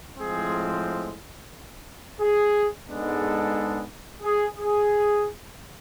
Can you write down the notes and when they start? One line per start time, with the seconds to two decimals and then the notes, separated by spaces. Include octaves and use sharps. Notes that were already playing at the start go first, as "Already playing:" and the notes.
0.18 A2 F3 G#3 C4 G#4
2.20 G#4
2.87 G#2 G#3 B3 D4 A4
4.22 G#4
4.56 G#4